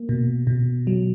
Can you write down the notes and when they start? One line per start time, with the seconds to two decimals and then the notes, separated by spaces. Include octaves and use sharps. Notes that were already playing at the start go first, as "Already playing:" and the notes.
Already playing: A#3
0.09 B2
0.47 B2
0.87 F#3